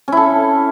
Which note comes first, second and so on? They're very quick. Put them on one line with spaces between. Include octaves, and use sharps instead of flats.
C#4 E4 A4